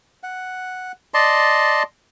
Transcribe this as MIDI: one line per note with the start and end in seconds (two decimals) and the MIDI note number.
0.23 0.92 78
1.14 1.83 74
1.14 1.83 75
1.14 1.83 81
1.14 1.83 84